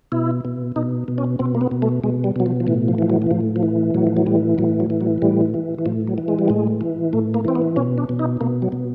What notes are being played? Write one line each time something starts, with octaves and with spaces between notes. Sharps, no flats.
B2 E4
B2
B2 D#4
B2
C#4
B2 C4
A#3
B3
B2
A3
B2 G#3
G3
B2 F#3
F3
F3
A2 E3
F3
E3 F3
F#3
E3
A2 F3
F3
E3
A2 F#3
F3
F#3
E3 G3
A2 F#3
F#3
E3
F#3
A2 G3
E3
E3
A2 F3
F#3
E3
G#3
G3
A2 G#3
E3
A2 A3
A#3
E3 C4
B3
B2 C#4
D4
B2
D#4
B2 A#3
F#3
B2